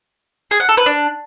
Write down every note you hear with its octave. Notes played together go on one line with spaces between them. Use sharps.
G#4
F#5
A4
B4
D4